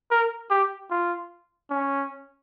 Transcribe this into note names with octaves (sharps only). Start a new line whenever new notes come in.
A#4
G4
F4
C#4